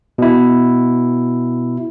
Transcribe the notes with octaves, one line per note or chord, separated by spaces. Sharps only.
B2 E4